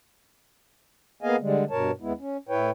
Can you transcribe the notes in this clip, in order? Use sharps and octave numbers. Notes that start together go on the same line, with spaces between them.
A#3 B3 G#4 D#5 F5 G#5
D3 G3 G#3
G2 B2 A#4 C#5 A5
D#2 G#3 B3 E4
C#4
A2 E4 B4 C#5 G5